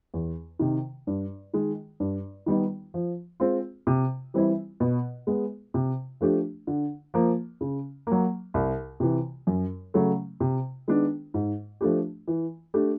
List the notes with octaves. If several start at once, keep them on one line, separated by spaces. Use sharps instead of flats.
E2
C3 D#3
G2
D#3 G#3
G2
D#3 G3 B3 D#4
F3
G#3 C4 F4
C3
E3 G3 C4 E4
B2
G#3 B3
C3
F3 A3 D4 G4
D3
F3 A#3
C#3
F#3 A#3
C2
C3 E3
F#2
C#3 F#3 A3
C3
D#3 G#3 B3 D4
G#2
F3 A3 D4 G4
E3
A3 D4 G4